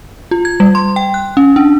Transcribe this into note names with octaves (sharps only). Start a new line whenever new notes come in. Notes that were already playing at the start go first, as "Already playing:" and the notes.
F4
G#6
G3
C6
G5
F#6
C#4
D4